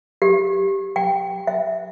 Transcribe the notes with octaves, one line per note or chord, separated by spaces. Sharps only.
G4
G5
E5